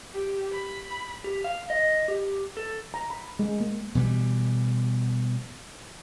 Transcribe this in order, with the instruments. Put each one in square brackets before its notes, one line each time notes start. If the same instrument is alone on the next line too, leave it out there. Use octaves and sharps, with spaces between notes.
[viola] G4
B5
[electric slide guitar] G4
F5
D#5
G4
A4
[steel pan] A#5
B5
G#3
A#3
[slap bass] B2 E3 G3